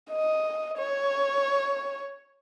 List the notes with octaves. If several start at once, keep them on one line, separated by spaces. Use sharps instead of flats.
D#5
C#5